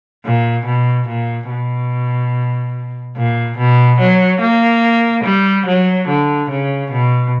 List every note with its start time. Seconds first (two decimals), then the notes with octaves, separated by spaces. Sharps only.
0.24 A#2
0.65 B2
1.07 A#2
1.50 B2
3.16 A#2
3.58 B2
3.99 F#3
4.40 A#3
5.24 G3
5.66 F#3
6.08 D3
6.50 C#3
6.91 B2